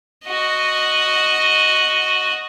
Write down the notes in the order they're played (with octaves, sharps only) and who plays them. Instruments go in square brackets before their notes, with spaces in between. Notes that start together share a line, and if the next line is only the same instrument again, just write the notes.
[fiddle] F#4 D#5